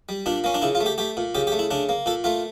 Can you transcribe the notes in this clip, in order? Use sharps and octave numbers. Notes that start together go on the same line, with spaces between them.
G3
A#2 D4
A#3 C#4
D4
C#3 E4
F4
A3
G4
A3 G4
A#2
C#3 G4
G4
A3
E4
C#3 D4
A#3
A#2 A4
A3 F4